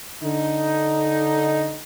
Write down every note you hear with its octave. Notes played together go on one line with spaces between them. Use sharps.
D3 D#4